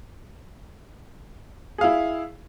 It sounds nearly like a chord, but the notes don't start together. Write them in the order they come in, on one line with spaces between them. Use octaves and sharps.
G#4 F5 E4